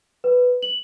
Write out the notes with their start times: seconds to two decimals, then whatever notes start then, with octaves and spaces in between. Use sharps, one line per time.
0.24 B4
0.63 F#7